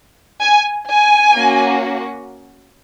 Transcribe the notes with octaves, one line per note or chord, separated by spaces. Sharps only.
G#5
G#5
A#3 C#4 F#4